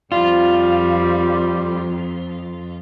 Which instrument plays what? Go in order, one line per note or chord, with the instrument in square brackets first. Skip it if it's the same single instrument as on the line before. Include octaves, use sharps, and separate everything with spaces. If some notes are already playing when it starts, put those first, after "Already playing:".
[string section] F2 [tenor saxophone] G3 [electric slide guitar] F4